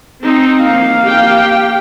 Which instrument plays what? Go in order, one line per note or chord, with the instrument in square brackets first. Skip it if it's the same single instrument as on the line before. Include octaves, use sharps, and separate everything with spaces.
[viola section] C4 D#4
[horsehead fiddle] A#3 F5
[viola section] G4 G5